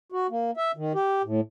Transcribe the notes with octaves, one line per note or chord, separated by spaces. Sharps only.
F#4
A#3
E5
D#3
G4
A2